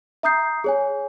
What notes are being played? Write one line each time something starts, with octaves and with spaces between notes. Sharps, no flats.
E5 A#5 D#6 G6 C7
G#4 C#5 G#5